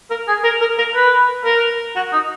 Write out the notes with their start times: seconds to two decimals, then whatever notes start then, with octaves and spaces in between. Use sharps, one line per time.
0.10 A#4
0.28 G#4
0.44 A#4
0.61 A#4
0.78 A#4
0.95 B4
1.45 A#4
1.96 F#4
2.13 D#4